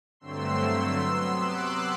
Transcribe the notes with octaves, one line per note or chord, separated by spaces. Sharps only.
G2 D3 F#3 A3 C4 C6 E6
C3 F#3 B3
D6 F#6